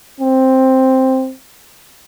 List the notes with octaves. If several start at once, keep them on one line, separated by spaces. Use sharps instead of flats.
C4